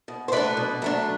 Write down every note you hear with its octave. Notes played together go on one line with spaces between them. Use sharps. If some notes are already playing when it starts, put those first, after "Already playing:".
B2
C5
F#3 A3 D4 B4 D5
B2
F#3 A3 D4